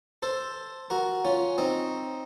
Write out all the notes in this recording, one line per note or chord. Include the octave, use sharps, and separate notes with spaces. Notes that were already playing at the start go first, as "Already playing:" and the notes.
A4 C5
F#4 A#4
C#4 F4
C4 D#4